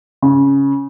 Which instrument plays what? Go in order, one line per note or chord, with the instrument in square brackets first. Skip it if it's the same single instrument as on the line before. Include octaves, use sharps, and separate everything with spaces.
[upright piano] C#3